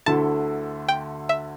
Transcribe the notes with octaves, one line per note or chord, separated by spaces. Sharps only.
D2 D3 A3 E4 A4 A5
G5
E5